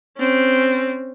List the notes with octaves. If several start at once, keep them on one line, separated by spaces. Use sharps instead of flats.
C4 C#4